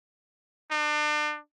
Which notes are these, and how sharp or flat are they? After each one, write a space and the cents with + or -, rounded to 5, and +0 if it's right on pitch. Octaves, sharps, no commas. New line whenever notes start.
D4 +35